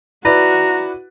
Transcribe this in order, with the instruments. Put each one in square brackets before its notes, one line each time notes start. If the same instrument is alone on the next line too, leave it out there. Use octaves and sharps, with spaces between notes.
[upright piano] E4 B4 D5 [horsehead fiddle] F#4 [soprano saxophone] A#5